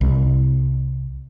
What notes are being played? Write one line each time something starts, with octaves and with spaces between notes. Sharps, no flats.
C2